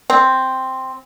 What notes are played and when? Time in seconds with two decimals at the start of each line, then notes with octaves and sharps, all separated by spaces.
0.10 C4